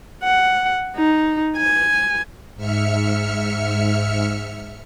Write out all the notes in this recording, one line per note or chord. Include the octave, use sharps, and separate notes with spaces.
F#5
D#4
G#5
G#2 E5 F6 C#7